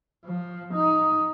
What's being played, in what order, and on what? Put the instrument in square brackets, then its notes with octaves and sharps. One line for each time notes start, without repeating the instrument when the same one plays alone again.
[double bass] F3
D#4